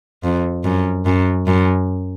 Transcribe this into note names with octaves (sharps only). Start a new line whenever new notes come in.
F2
F#2
F#2
F#2